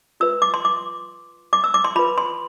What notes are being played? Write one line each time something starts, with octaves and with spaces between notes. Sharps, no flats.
F4 B4 E6
D6
C6
D6
D6
E6
D6
C6
F4 B4 B5
C6